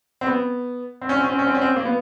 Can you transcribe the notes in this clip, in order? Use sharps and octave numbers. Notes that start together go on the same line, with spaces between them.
C4
B3
C4
C#4
C4
C#4
C4
C#4
C4
C#4
C4
A#3
B3